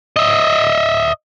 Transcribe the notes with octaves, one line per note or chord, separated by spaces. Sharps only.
D#5 E5